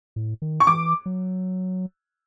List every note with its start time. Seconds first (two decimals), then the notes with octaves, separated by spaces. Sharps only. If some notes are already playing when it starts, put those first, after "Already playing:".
0.16 A2
0.42 D#3
0.60 C#6
0.67 E3 D6
1.06 F#3